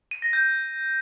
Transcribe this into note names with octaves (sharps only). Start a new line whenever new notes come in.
D#7
A#6
G6